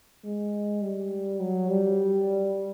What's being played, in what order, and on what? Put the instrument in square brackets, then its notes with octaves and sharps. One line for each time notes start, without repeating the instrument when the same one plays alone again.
[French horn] G#3
G3
F#3
G3